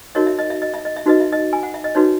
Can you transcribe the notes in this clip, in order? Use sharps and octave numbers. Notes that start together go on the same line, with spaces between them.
D#4 F#4 A#4 C#5 D#5
E5
D#5
E5
D#5
E5
D#5
E5
D#4 F#4 B4 D#5
E5
D#5
G#5
F#5
E5
D#5
D#4 F#4 B4 C#5